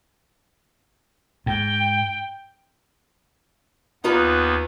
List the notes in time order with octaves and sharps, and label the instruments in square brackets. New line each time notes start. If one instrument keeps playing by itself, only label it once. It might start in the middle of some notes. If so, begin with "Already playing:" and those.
[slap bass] G#2 [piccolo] G5
[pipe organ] D#2 B3 [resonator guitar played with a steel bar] D#4 F4 B4